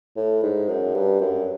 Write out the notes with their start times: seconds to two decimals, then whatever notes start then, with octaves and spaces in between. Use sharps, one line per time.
0.16 A2
0.43 G#2
0.69 F#2
0.94 G2
1.21 F#2